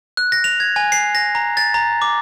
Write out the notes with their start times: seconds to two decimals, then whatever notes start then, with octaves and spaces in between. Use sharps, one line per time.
0.17 F#6
0.32 A#6
0.44 F7
0.60 G#6
0.76 G#5
0.92 C7
1.15 A#6
1.35 A#5
1.57 A6
1.74 A#5
2.02 D6